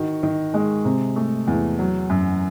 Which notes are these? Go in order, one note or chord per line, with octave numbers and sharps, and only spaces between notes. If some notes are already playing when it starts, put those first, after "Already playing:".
Already playing: D#3 F#4
D#3
G#3
C3
A3
E2
F#3
F#2